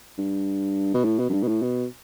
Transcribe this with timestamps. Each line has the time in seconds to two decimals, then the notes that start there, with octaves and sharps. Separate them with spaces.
0.18 G2
0.94 B2
1.04 A2
1.19 B2
1.29 F#2
1.33 G2
1.42 B2
1.48 A2
1.62 B2